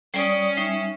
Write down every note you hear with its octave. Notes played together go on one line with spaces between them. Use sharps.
G3 C#4 D5 D#6
G3 D#4 E5